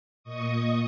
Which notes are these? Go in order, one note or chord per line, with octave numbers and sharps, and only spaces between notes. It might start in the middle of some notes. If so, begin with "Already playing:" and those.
A#2 D#5 C#6 D#6